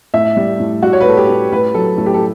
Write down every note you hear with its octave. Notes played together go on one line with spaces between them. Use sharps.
A2 E5
G3
A2
G3 F#4
C#5
B4
A2 A4
G4
A2
A2 B4
F#3 A4
A2 A4
G4
A4